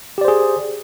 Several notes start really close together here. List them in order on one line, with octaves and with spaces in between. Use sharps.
G4 D5 C5 G#4